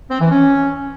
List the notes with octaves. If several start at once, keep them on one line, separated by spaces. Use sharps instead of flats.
C4
E3
C#4